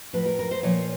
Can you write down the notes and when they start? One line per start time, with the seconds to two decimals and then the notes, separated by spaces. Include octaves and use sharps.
0.13 A2 F3 B4
0.26 A#4
0.39 A#4
0.51 C5
0.63 A#2 F3 C#5